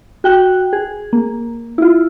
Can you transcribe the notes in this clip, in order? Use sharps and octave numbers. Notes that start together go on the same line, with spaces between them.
F#4 G5 F#6
G#4
A#3
E4 F4